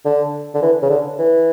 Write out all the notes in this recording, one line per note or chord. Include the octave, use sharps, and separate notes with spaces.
D3
D3
E3
C#3
D3
E3